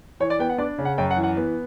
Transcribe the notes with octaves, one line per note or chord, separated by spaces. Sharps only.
E3 C#5
D5
B3 G5
F#5
D4 D5
C#3
F#5
F#2 G5
F#5
E3
F#5
B3